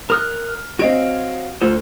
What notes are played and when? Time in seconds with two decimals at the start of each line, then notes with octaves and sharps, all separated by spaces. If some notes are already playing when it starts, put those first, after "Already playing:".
0.10 A#4 D#6 F6 F#6
0.79 C4 F#4 C#5 D#5 F5 D7
1.61 D2 F4 A4 C5